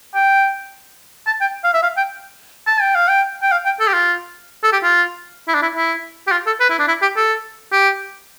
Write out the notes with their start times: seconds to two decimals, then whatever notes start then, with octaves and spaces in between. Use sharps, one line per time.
0.14 G5
1.27 A5
1.41 G5
1.64 F5
1.74 E5
1.83 F5
1.97 G5
2.67 A5
2.81 G5
2.95 F5
3.08 G5
3.42 G5
3.52 F5
3.65 G5
3.80 A4
3.88 G4
3.93 F4
4.63 A4
4.73 G4
4.83 F4
5.48 E4
5.54 D4
5.62 E4
5.76 E4
6.27 G4
6.32 F4
6.46 A4
6.60 B4
6.70 E4
6.79 D4
6.88 E4
7.02 G4
7.17 A4
7.72 G4